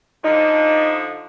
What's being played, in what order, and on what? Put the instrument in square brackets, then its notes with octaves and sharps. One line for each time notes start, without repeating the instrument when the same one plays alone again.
[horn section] D3 F3 [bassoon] D#4